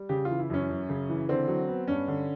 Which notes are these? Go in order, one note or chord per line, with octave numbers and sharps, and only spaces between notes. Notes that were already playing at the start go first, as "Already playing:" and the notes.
Already playing: G3
C#3 G4
E3 F4
E4
F#2 C#4
F#2
C#3
E3
D3 C4
F#3
B3
G2 C#4
D3